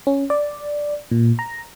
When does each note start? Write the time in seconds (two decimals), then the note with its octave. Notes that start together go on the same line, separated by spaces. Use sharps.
0.07 C#4
0.30 D5
1.11 A#2
1.39 A#5